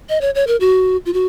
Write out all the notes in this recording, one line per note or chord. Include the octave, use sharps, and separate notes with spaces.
D#5
C#5
C#5
A#4
F#4
F4
F#4